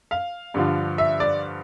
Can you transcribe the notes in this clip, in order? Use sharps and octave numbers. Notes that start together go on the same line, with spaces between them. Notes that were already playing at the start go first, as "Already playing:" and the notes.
F5
G2 D3 F3
E5
D5